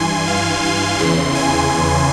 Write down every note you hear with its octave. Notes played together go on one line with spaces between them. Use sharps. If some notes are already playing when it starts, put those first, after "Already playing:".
Already playing: G2 E3 G#5 C6
F5
C6
E2 C#3 E3 C6
G#5